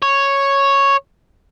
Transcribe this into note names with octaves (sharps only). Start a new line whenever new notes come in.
C#5